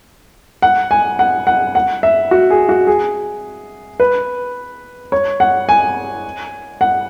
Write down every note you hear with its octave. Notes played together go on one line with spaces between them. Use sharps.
F#5
G#5
F#5
F#5
F#5
E5
F#4
G#4
F#4
G#4
B4
C#5
F#5
G#5
F#5